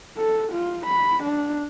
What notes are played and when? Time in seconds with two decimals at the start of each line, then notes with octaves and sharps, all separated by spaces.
0.17 A4
0.53 F4
0.86 B5
1.23 D4